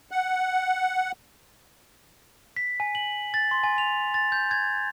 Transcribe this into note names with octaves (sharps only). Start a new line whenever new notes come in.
F#5
B6
G#5
F#7
A6
C6
G#5
F7
A6
G6
G#6